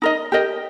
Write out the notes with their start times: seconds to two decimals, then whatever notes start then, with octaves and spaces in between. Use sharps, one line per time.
0.02 D#4 A#4 D#5
0.32 G4 A#4 D#5